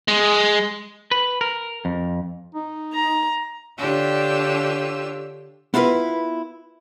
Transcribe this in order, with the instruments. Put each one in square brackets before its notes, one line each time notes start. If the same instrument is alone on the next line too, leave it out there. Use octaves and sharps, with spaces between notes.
[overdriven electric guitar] G#3
[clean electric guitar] B4
A#4
F2
[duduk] D#4
[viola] A#5
[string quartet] D3 D4 F4 G4 C#5 E6
[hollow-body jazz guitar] B3 E4 F4 G#4 A#4 B4